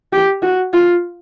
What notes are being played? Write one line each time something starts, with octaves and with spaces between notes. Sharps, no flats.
G4
F#4
F4